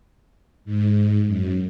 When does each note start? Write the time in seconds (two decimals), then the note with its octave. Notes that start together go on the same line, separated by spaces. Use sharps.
0.65 G#2
1.26 F#2